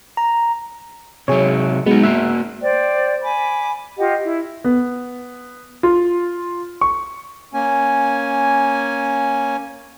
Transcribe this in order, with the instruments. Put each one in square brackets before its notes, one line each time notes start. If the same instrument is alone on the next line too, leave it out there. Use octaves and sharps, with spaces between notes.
[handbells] A#5
[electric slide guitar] C3 F#3 [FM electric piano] G#4 C#5
[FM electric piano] G#3 F#4 [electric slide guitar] B3 D#4
[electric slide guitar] A#3 F#4 [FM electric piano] E5
[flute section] C5 D5 G5
G#5 B5 D6
F4 G4 D#5 F#5
E4
[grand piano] B3
F4
C#6
[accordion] A#3 C#4 G#5